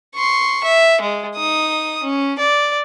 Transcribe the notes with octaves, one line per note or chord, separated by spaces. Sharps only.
C6 C#6
E5
G#3
D#4 D#6
C#4
D5